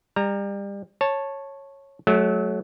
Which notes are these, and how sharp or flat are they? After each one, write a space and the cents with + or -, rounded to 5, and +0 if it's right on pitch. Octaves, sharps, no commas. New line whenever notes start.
G3 +30 A#5 -5
C#5 -10 A5 +0
F#3 +0 A3 -35